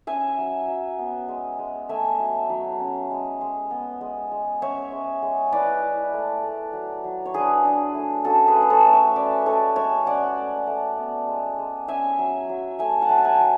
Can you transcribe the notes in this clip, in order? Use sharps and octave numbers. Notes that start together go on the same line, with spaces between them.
C#4 E5 G#5
F#3
F#3
B3
G#3
G#3
A3 E5 G#5
F#3
F#3
C#4
G#3
G#3
B3
G#3
G#3
C#4 C#5 E5
G#3
G#3
E4 B4 D5
E4
A3
A3
F#3
F#3
C#5
D4 G#4 B4
D4
A3
C#4 F#4 A4
G#4 B4
A3
B4
A4 C#5
A3
C#5 E5
C#4 B4 D5
G#3 A4 C#5
G#3 C#5 E5
C#4 D5 F#5
A3
A3
B3
G#3
G#3
C#4 E5 G#5
F#3
F#3
A3 E5 G#5
F#5 A5
F#3
A5
E5 G#5
F#3